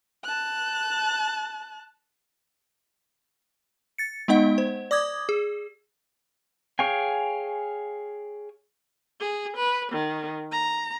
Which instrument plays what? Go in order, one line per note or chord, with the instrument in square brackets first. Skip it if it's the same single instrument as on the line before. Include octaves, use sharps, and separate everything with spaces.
[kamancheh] A5 F#6
[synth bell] A6 C#7
G#3 B3 D#4 D#5 F#5
C5
D5 D6 D#6 G#6
G#4
[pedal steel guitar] G#4 C#5 F5 G5 G#5
[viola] G#4
B4
D#3
A#5